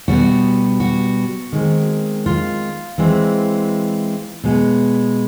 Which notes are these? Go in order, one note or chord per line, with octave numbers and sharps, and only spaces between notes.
B2 G3 B3 F#4
F#4
D#3 G#3 C4
F4
E3 G#3 C4
B2 G#3 B3